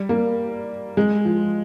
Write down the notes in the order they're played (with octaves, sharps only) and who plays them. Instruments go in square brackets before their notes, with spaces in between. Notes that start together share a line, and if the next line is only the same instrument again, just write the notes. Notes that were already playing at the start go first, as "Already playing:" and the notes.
Already playing: [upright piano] G3
A#3
G#3
F3